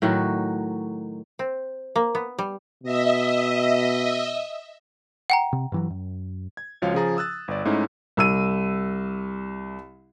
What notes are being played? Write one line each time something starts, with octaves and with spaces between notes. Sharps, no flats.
A2 D#3 F#3 F#4
C4
A#3
B3
G3
B2 D#5 E5
F#5 G5 A#5
C3
G2 E3 F#3
F#2
G#6
C#2 F3 F#4 C#5 F5
C#3 F3 F4 G#4 A#5 A6
D#6 E6 F#6 A6
G1 D5
G#2 A3 C#4 D#4 E4
C2 E6 D#7